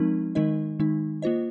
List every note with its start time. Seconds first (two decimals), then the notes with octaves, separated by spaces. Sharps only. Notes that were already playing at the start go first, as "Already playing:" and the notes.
Already playing: F3 G#3 C4 D#4 A#4
0.35 D#3 G#3 D#4 A#4 D#5
0.80 D#3 G#3 D#4
1.22 A#3 F4 C5 D#5